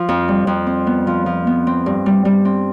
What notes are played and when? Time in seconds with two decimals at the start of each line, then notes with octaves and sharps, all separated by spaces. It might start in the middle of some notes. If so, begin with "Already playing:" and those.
Already playing: F3 F4
0.09 F2
0.28 G3
0.47 F2
0.67 C4
0.87 B3
1.07 F3
1.26 F3
1.47 B3
1.67 C4
1.86 G2
2.06 G3
2.25 G3
2.45 C4